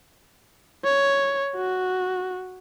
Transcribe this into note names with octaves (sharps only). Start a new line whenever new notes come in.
C#5
F#4